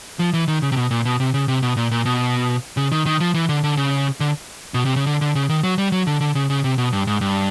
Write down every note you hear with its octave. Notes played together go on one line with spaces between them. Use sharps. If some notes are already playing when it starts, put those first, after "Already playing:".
F3
E3
D#3
C#3
C3
B2
A#2
B2
C3
C#3
C3
B2
A#2
A#2
B2
C#3
D#3
D#3
F3
E3
D3
D3
C#3
D3
B2
C3
C#3
D3
D3
C#3
D#3
F#3
G3
F#3
D3
D3
C#3
C#3
C3
B2
G2
G#2
G2